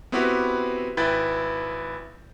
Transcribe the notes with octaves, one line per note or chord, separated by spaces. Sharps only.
B3 C4 E4 F#4 G4 B4
G#1 E4 B4 G5 G6 A6